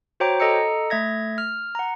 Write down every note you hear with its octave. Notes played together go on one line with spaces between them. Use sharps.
F#4 C5 C#5 G5 A#5 D6
A4 D#5 A#5 E6 C#7
A3 E5 G#6 A#6
F6
F#5 A#5